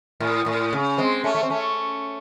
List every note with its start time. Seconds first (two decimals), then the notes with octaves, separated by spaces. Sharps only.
0.20 A2
0.46 A2
0.73 C#3
0.98 G#3 C4
1.24 A3 C#4
1.35 A3
1.43 C4
1.50 A3 C#4